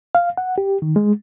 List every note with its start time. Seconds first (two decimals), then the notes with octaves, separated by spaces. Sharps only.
0.15 F5
0.37 F#5
0.58 G4
0.82 D#3
0.96 G#3